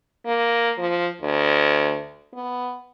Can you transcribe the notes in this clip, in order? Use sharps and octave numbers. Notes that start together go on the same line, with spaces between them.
A#3
F3
D2
B3